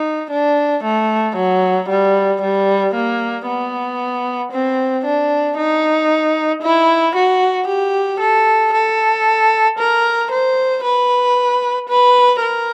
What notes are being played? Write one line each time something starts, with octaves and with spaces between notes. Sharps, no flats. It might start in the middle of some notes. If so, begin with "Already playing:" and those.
Already playing: D#4
D4
A3
F#3
G3
G3
A#3
B3
C4
D4
D#4
E4
F#4
G4
A4
A4
A#4
C5
B4
B4
A#4